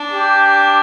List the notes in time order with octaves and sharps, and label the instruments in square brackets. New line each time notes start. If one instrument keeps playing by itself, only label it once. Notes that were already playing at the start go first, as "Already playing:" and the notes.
Already playing: [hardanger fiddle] D4
[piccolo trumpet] G4